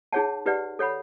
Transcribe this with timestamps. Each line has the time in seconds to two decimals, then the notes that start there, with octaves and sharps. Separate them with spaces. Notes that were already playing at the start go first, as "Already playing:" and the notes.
0.12 D#4 G#4 C#5 F#5 A5
0.46 D#4 G4 B4 D5 F#5
0.79 A4 C#5 F#5 B5